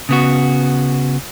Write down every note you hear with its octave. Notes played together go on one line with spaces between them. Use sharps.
C#3 B3 F#4